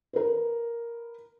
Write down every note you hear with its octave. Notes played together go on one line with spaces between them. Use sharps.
A#4 B4